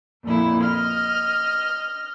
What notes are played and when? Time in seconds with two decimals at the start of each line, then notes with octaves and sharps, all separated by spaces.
0.25 F2 A#2 E4
0.63 D#5 F6